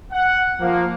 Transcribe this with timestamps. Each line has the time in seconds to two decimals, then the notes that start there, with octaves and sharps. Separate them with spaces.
0.12 F#5
0.60 F3 A#3